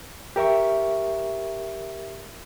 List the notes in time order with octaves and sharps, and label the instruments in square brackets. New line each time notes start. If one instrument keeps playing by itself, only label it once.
[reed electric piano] G4 A#4 E5 C#6